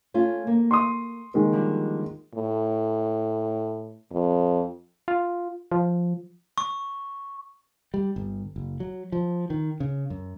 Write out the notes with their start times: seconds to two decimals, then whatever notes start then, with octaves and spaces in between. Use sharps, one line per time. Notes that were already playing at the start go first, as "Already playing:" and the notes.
0.14 A3 C#4 F4
0.47 A#3
0.71 C6 C#6 D#6
1.34 D#3 G#3 A#3
1.52 D3 F3 G3
2.34 A2
4.11 F2
5.08 F4
5.72 F3
6.58 C#6
7.94 G3
8.16 G1
8.56 F#1
8.80 F#3
9.12 F3
9.50 D#3
9.80 C#3
10.10 F#2